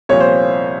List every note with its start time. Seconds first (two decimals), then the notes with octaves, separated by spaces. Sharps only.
0.09 C2 A#2 F3 C#5
0.20 C5